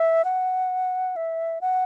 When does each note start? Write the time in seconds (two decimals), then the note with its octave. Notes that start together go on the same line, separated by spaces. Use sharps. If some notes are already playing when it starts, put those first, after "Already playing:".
Already playing: E5
0.25 F#5
1.16 E5
1.61 F#5